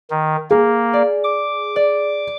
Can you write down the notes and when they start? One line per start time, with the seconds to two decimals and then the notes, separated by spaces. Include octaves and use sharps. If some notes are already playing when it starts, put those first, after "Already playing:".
0.10 D#3
0.51 A#3 G#4
0.93 D5
1.24 D6
1.76 D5